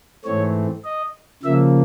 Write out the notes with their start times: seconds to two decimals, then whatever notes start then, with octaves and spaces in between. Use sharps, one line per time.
0.25 G#2 E3 A3 C4 C#5
0.84 D#5
1.43 C#3 F3 A#3 E5